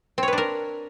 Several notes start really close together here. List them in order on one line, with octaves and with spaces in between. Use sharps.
C4 C#5 B4 D4 A#4